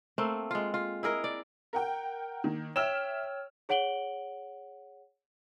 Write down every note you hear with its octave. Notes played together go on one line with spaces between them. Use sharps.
A3 A#3 C4
G#3 F4
F4
E4 G#4 A#4 D#5
D5
A#4 F#5 G5
D#3 A#3
C#5 E5 G5 E6 F6 E7
G#4 C#5 F#5 D7 F#7 G7